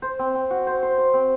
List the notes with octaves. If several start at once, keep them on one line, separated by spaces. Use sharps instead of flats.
C5
C4
C4
F#4
C5
C5
C5
C4